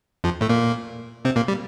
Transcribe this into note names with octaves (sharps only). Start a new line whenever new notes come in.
F2 F3
A2 A3
A#2 A#3
C3 C4
A#2 A#3
G3